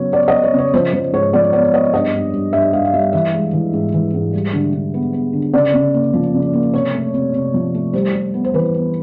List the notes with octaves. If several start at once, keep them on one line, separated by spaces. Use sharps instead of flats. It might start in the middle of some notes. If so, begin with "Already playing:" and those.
Already playing: C#3 F#3 B3 C#5
B3 D5
D#5
B3
C#5
C#3 C#5
F3 C5
F3 C5
G#2 C#5
F3 D5
B3 D5
B3 D#5
G2 D#5
G2
G2
G2 E5
G2 F5
F5
G3 E5
E3 E5
G#3
E3
G#2
E3
G#2
G3
D3
D3
B3
B3
D3
C#3 D5
C#3
A#3
F3
C#3
A#3
C3 C#5
A3
C3
C3
F3
A3
G3 C5
G3
B3
C5
E3 B4
B3